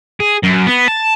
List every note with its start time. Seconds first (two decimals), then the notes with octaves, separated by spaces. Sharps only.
0.20 G#4
0.44 F#2
0.67 B3
0.88 A5